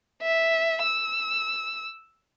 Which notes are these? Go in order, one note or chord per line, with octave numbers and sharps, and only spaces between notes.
E5
E6